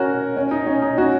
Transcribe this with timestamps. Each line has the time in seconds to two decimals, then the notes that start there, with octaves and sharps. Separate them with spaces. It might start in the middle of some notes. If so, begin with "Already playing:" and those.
Already playing: C#4 F#4 A#4
0.37 C#4
0.51 D#4
0.67 C#4
0.82 D#4
0.98 C#4 F#4